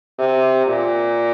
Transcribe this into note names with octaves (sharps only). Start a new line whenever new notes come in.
C3
A#2